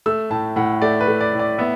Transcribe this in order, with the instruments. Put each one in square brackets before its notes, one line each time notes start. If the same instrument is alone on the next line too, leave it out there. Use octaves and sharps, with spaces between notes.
[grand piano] A3 E6
A2 A5
A2 F#5
A3 D5
B4
A3
D5
A2
D5
B3 E5